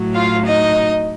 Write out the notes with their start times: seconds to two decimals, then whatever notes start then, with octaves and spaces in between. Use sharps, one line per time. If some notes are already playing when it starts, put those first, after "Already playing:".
Already playing: A2 F#3
0.14 F4 F5
0.45 D#4 D#5